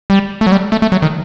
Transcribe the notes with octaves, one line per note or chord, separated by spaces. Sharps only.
G3
A3
F#3
G3
A3
A3
F#3
D#3